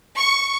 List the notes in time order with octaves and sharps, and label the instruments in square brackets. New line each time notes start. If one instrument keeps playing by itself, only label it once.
[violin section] C#6